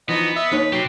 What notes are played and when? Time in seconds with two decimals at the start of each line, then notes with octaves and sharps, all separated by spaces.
0.09 E3 F3 B3 D#4 D#5
0.36 D#5 E5
0.51 D#2 D#4 B4 C#5
0.73 F#3 C4 G4